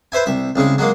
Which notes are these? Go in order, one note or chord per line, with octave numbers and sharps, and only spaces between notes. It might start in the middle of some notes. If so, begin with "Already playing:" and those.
B4 C5 E5 G#5
C2 E5
C2 C#3 G#3
F#3 G#3 A#3